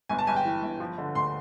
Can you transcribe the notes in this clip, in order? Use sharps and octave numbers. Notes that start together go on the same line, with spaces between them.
G1 G#5
A5
G1 G#5
G5
E3
G1
F3
D3
D2 C6